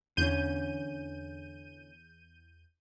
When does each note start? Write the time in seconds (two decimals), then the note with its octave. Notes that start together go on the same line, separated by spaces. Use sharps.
0.17 E2 D3 C#4 G6 D#7